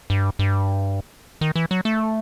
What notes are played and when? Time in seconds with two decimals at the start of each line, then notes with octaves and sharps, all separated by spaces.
0.10 G2
0.39 G2
1.41 D#3
1.56 E3
1.71 F#3
1.85 A3